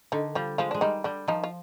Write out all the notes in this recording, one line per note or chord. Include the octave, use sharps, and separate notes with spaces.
D3 D#3 D#4
F3 G3 F4
F3 G#3 F4
G#3 D4
D#3 G3 D#4
D3 G3 D4
D#3 F3 D#4
F4